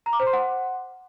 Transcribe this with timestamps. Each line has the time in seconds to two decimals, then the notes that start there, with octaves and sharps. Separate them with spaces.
0.06 A#5
0.13 D6
0.20 C5
0.26 C6
0.33 F#5